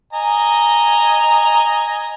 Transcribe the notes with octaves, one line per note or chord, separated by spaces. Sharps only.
D#5 G#5 A#5